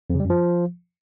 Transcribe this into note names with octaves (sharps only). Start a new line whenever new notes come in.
F2
C#3
G3
F#2
F3